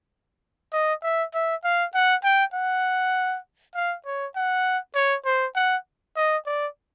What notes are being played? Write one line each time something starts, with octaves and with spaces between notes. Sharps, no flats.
D#5
E5
E5
F5
F#5
G5
F#5
F5
C#5
F#5
C#5
C5
F#5
D#5
D5